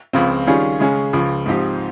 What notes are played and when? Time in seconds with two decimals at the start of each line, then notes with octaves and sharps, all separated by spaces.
0.13 C#2 C#3 F3 C4
0.47 D#3 G3 C#4 F4 G#4
0.80 C#3 G#3 C#4 G#4
1.13 C#2 C#3 F3
1.46 G#2 F3 C4 D#4 G4